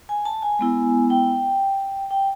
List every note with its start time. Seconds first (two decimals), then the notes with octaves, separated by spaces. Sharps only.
0.09 G#5
0.25 A5
0.42 G#5
0.59 G#3 B3 E4
1.10 G5
2.11 G5